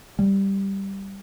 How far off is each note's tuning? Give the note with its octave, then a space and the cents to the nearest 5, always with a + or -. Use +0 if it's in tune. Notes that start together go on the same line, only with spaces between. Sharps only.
G3 +0